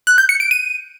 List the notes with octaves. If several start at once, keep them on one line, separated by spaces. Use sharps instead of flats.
F#6
G6
C#7
D7
D#7